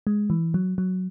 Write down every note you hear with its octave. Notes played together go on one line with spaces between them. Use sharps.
G#3
E3
F#3
F#3